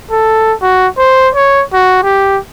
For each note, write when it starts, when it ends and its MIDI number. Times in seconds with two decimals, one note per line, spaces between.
0.11 0.53 69
0.62 0.88 66
0.98 1.29 72
1.35 1.63 73
1.74 2.00 66
2.03 2.38 67